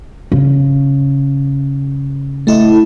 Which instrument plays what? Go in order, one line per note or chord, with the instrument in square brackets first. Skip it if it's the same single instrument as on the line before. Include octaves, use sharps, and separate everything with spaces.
[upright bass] C#3
[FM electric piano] A3 E4 D#5